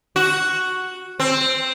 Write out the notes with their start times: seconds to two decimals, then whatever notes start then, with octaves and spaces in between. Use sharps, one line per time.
0.16 F#4
1.20 C4